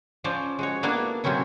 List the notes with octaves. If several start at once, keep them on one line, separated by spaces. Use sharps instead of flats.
F3 C#4 C5 D5
G#3 F#4 C#5
A#3 B3 D4 E4 B4
C3 F#3 C4 C#4 E4